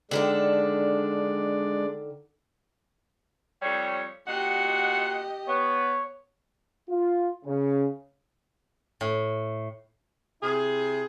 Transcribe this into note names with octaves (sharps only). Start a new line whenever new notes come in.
D3 D#3 G#3 D4 A4 D5
F2 G3 C#5
A#2 F#4 G4 D#5 F#5
B3 C#5
F4
C#3
A2
C3 E4 G#4